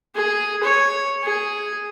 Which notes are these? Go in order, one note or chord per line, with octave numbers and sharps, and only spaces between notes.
G#4
C#5
G#4